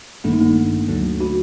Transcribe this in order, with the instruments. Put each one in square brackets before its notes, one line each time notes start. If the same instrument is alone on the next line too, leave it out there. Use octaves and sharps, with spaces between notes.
[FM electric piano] A1 G2 D#3 A3 [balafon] A#3 D4
[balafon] D#4
A#3 D4
[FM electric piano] D2 D3 F#3 A3
[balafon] D4 F#4